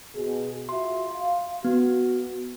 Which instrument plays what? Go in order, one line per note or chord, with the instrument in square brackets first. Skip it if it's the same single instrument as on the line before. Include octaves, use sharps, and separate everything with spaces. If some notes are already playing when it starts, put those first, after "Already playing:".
[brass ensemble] B2 G#4
[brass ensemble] F4 F#4 E5 [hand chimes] C6
[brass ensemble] F5
[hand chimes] B3 [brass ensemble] F#4